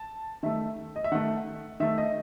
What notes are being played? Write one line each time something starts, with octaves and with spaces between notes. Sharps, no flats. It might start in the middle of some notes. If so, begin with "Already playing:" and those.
Already playing: A5
D#3 A3 E5
D#5
E5
D#3 A3 F#5
D#3 A3 E5
D#5